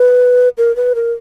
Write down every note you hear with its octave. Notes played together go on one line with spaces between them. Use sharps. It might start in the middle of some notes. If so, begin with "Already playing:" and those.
Already playing: B4
A#4
B4
A#4